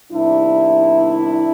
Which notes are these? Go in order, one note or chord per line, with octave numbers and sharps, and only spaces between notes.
E2 C3 D#3 G3 D4 E4